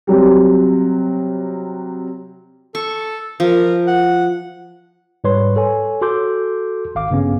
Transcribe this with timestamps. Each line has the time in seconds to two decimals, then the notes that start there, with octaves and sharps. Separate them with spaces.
0.07 C3 F#3 G3
2.75 A4 C#6
3.40 F3 A#4
3.87 F#5
5.24 G#2 G3 B4 C#5 C6
5.56 A4 C#5 G#5
6.01 F#4 A4 C6 D6 G6
6.95 G#1 F5 D6
7.10 G2 C#3 B3 C#4